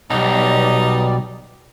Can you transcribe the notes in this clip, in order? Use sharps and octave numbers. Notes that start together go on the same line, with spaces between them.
B1 B2 G3 D#4 D5